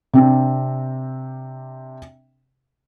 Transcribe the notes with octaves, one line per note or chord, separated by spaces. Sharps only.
C3 C4 D4